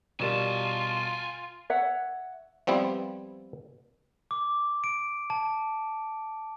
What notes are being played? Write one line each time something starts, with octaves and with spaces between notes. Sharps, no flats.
B2 G3 F4 A#4 G#5 A5
C#5 E5 F#5
F3 G3 B3 C4 E4
D6
D7
A5